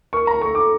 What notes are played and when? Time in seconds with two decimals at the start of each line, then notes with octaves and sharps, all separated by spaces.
0.13 A#4 C#6
0.27 A#5
0.41 A4 C#6
0.55 D6